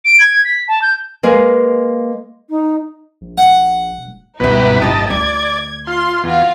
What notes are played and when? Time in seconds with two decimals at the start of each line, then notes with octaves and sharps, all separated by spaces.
0.04 D7
0.19 G#6
0.44 B6
0.68 A5
0.81 G6
1.23 G#3 A#3 A#4 B4 F5
2.49 D#4
3.21 A#1
3.38 F#5
3.97 E1
4.40 C#2 G2 B2 D#4 E4 G4 B4
4.82 D1 G1 D#5 A5
5.10 D2 D5 G#6
5.87 F4 C6
6.24 E2 F4 F#4 F5